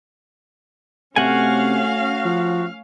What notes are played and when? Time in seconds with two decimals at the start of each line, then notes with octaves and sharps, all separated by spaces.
1.16 C3 A3 C#4 F#4 F5 F#5 G#5
2.25 F3